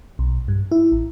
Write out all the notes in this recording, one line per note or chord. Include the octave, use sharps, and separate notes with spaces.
B1
G2
E4
A1